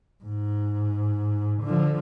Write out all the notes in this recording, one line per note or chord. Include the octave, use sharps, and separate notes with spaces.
G#2
D3 F3